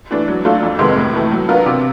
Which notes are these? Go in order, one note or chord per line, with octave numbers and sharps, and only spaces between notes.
E3 A3 D4
F#3
A3 D4 F4 A4
F2
C3 D#3 G#3 B3
A2
E3 A3
F#3
B3 D4 F4 A#4
C3